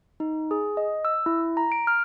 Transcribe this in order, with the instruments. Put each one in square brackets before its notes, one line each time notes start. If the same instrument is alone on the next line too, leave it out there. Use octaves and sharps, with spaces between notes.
[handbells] D#4
G#4
D#5
E6
E4
A#5
D7
F6